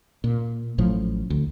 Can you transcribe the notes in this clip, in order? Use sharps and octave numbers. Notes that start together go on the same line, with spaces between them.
A#2
A1 A2 F3 F#3
D2